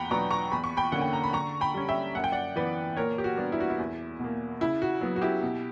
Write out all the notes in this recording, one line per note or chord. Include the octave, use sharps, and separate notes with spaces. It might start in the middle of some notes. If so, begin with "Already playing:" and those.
Already playing: E2 F#5 G5 A#5 B5
B2 F#3 B3 D4 A#5 C#6
A#5 C#6
E2 B5
C#6
G5 B5
D3 A#3 C#4 F#5
G5
A#5
B5
D3 A#5 C#6
G5 B5
G3 C#4
E5 G5
F#2 F#5
G5
D5 F#5
E3 B3 B4 D5
A#2 A#4 C#5
G4
F#4
G3 B3 D4
E4
F#4
E4
E2
B2 A#3
C#3 E4
F#4
F#3 B3
F#4
E4 G4
B2